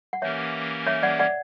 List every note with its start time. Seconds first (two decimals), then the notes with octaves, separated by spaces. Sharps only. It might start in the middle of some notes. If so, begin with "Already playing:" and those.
0.13 F#5
0.22 E3 A#3 C#4 G4 A#4 C#5 E5
0.87 C#5 E5
1.03 D5 F#5
1.19 D5 F#5